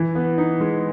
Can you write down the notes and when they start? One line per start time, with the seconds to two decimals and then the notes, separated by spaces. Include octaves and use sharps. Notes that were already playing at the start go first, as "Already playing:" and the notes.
Already playing: E3
0.15 B3
0.38 D#4
0.60 G#3